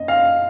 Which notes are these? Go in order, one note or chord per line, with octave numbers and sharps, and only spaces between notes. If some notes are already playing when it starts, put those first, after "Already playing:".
Already playing: F#2 A#3 D#5
F5